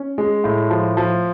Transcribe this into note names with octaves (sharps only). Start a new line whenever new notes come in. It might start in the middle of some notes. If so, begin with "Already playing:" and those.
Already playing: C#4
G#3
A2
F3
F3